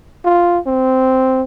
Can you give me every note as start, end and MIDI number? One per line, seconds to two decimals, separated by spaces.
0.25 0.59 65
0.66 1.42 60